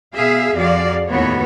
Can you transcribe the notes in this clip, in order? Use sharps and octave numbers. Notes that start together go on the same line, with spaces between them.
B2 G#4 E5 F5
F2 F#4 G#4 D5 F5
D#2 A2 B3 F#4 C#5